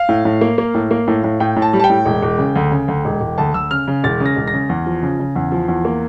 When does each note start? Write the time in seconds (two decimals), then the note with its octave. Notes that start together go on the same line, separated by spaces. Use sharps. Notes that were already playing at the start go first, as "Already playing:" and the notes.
Already playing: F5
0.09 A2
0.25 A2
0.41 A#3
0.58 A#3
0.74 A2
0.91 A#3
1.08 A2
1.24 A2
1.40 A2 G5
1.56 A2
1.62 A5
1.73 G3
1.80 A5
1.84 G5
1.90 A2
2.06 E1
2.22 E1
2.39 C#3
2.56 D2
2.71 C#3
2.88 D2
3.05 E1
3.21 E1
3.38 D2 A5
3.54 D2 E6
3.71 C#3 F6
3.88 C#3
4.04 E1 A6
4.20 C#3
4.26 A#6
4.36 E1
4.48 A#6
4.53 C#3
4.69 E2
4.86 F3
5.03 C#3
5.19 C#3
5.36 E2
5.52 F3
5.68 E2
5.85 A#3